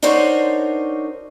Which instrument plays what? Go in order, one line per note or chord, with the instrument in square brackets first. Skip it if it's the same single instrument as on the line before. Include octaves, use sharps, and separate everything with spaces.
[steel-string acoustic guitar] D4 D#4 F#4 A#4 C5 C#5